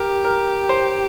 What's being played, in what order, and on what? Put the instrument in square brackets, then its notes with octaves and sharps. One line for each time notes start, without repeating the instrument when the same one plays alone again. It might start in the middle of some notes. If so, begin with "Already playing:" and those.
Already playing: [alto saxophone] G4 [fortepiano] A#4
[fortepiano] A#4
C5